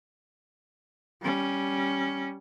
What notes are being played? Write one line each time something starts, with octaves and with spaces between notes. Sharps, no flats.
G3 C#4